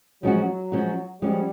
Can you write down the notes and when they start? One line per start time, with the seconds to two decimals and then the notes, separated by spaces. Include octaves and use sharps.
0.23 F3 F#3 G#3 C#4 F#4
0.72 F3 G#3 C#4 F#4
1.21 F3 G3 G#3 C#4 F#4